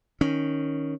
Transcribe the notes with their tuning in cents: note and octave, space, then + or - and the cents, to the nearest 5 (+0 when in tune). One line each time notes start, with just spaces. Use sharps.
D#3 +0 C#4 +0